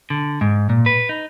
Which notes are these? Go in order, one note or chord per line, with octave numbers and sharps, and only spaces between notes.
D3
G#2
A#2
B4
D#4